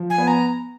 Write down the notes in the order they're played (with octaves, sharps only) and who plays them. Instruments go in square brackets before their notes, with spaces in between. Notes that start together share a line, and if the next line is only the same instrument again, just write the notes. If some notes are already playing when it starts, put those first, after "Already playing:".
Already playing: [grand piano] F3
[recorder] G#5
[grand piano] B3
[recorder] A#5